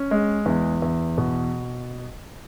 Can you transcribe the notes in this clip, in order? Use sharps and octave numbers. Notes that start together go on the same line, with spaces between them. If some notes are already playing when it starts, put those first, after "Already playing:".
Already playing: C#4
G#3
E2
E2
B2